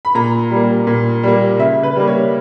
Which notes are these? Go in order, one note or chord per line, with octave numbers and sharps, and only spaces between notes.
B5
A#2 A#5
G3 A#3
A#2
G3 A#3
C#3 E5
B4
G3 A#3
C#5